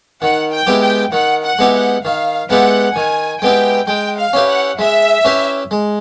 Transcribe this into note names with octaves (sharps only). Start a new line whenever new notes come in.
D#3 F#5
G5
G#3 B3 E4 G4
G5
D#3 F#5
F#5
G#3 B3 E4 G4
F#5
D#3 F5
G#3 B3 E4 G4 F#5
D#3 G#5
G#3 B3 E4 G4 G5
G#3 G5
F5
C#4 E4 G4 B4
F#5
G#3 E5
C#4 E4 G4 B4
G#3